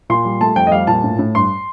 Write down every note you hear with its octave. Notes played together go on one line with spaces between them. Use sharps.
A#2 C6
G3
A3 A5
F2 G5
D#5
G3 F5
A#2 A5
A2
A2
G2 C6